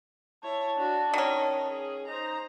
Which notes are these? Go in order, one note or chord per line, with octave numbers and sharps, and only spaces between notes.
E4 C#5 A5
D4 F#4
D#3 C#4 D#5
G#4
D#4 C5 A#5